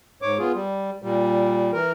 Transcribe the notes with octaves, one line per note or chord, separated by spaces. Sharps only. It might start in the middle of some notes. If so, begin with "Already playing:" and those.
G#2 C#5 D6
B3 F4 G#4
G3
A#2 G3
E3 A#4